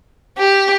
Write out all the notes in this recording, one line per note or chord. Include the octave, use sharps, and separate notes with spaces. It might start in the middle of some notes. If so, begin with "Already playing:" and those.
G4